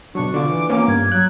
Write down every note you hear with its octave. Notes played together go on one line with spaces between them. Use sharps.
B2 F#3 D4 C#6
D3 D4 F4 D6
E3
A#3 B3 C#4 D6
G2 G#6
F#3 F#6